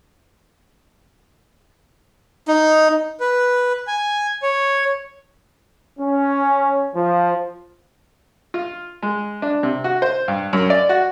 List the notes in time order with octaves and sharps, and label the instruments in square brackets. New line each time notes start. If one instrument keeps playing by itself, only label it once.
[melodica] D#4
[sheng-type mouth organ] B4
G#5
C#5
[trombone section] C#4
F3
[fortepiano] F4
G#3
D4
C3
F#4
C5
G2
F#2
D5
F#4